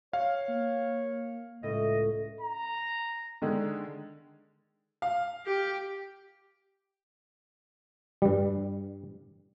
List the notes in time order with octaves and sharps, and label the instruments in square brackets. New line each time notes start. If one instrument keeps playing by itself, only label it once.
[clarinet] C#5 [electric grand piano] F5
[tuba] A#3
[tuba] C#2 [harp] A2 [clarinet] D#5
[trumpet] A#5
[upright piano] D3 D#3 G#3
[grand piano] F5
[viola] G4
[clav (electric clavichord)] G2 G3